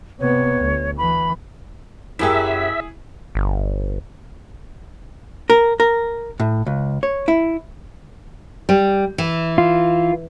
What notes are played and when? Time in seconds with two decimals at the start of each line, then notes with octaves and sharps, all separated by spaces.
0.19 C3 B3 C#5
0.61 D2
0.97 E3 B5
2.19 F#2 F#3 E4 G4 G#4 E5
3.35 G1
5.50 A#4
5.80 A#4
6.40 A2
6.67 C#2
7.03 C#5
7.28 E4
8.69 G3
9.18 E3
9.58 F4